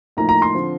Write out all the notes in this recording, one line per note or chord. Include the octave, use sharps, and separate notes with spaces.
A2 F3 A#3 D#4 A#5
A#5
C6
D3 F3 C4